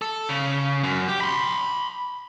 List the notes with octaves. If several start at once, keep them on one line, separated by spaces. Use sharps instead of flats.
A4
C#3
F#2
G4
B5 C6